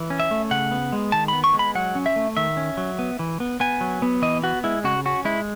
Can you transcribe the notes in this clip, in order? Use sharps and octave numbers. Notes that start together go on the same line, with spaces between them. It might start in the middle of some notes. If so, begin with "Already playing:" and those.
Already playing: E3
C#4
E5
A3
C#3 F#5
B3
G#3
D#3 A5
B3 B5
C#6
G#3
B5
F#3 F#5
C#4
E5
A3
D#3 E5
C#4
F#3
B3
E3
B3
B3 G#5
F#3
B3
E3 D#5
B3 F#4
G#3 E4
C#3 F#4
C#4 F#4
G#3 E4